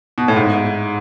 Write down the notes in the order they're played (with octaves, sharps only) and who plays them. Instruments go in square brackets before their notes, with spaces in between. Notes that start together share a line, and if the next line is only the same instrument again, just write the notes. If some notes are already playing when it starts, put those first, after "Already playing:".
[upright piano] B2
A2
G#2